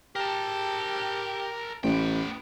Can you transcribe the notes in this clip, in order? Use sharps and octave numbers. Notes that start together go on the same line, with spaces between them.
G4 A#4 A5
A1 B3 G5